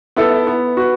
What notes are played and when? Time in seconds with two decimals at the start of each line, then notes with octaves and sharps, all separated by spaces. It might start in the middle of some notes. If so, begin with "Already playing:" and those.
0.16 B3 E4 A4
0.47 B3
0.77 F#4 B4